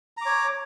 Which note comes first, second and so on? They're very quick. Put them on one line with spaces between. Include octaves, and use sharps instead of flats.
A#5 D6 C#5